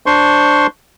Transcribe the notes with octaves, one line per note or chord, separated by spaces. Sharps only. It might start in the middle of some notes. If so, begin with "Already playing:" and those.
D4 C5 C6 C#6